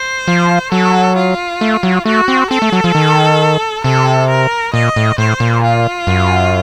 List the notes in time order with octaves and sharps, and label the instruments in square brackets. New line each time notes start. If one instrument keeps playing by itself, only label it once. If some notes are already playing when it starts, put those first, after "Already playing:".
Already playing: [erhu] C5
[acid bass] F3
[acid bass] F#3 [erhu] A4
[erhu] F4
[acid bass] A3
F#3
[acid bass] A3 [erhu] F#4
[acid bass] C4
[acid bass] C4 [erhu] A4
[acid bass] A3
F#3
F3
D#3
[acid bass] C3 [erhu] A4
[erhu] A#4
[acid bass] A#2 [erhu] D#5
[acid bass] A2
[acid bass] A2 [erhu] C5
[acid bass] A#2
[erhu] F4
[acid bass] F#2